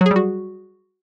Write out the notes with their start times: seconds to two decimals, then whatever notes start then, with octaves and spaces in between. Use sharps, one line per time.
0.01 F#3
0.06 G#4
0.11 G3
0.16 F#4